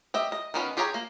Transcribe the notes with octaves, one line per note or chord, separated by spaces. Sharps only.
G4 D#5 E5
D#5
D#3 B3 C#4 F4 B4
F4 G4 G#4 C#5 A#5
A#3